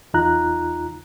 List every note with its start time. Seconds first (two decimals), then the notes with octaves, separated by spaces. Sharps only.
0.14 E2 D#4 F4 A#5 F#6